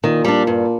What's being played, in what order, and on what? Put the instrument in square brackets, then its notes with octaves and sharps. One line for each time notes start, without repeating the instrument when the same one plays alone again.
[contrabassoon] A#2 [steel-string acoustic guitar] D#3
[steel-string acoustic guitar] G3 D4
G2